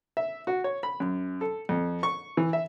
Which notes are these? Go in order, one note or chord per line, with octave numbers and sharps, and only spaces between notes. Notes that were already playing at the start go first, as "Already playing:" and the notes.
E5
F#4
C#5
B5
F#2
A4
F2
C#6
E3
E5